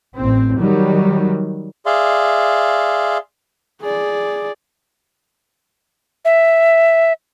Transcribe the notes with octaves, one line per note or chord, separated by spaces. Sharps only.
A1 C4
D#3 F#3 G3
G#4 D5 E5 F5 C6
G#4 D5
E5